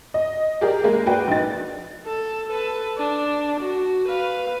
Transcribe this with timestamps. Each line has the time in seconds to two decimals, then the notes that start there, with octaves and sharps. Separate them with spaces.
0.14 D#5
0.61 G4 G#4 A#4 D5
0.84 G#3 A#3
1.06 F#4 B4 D5 G5
1.28 A#1 D#4 A6
2.06 A4
2.50 A4 B4
2.97 D4
3.60 F#4
4.09 B4 F5